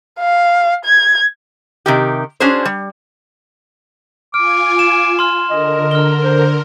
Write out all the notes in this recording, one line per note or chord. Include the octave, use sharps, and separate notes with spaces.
F5
G#6
C3 D#3 G4
C#4 D4 F#4 G#4 C5
G3
F4 G#5 D6 F6
E7
C6 F6
D3 A#4 D#5
F6 G7
C5